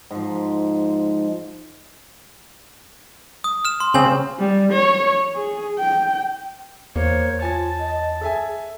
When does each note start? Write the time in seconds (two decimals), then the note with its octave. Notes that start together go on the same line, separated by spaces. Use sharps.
0.11 G#2 F3
3.44 D#6
3.65 F6 E7
3.80 C6
3.94 C#3 C4 G#5 F#7
4.39 G3
4.72 C#5
5.35 G#4
5.79 G5
6.96 E2 A#3 C5 C#5
7.42 F4 G#5 A5 A6
7.80 D#5
8.21 G#4 A4 E5 G#5